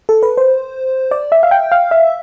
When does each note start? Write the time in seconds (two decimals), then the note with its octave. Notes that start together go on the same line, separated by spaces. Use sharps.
0.09 A4
0.23 B4
0.37 C5
1.11 D5
1.32 E5
1.43 F5
1.51 G5
1.72 F5
1.91 E5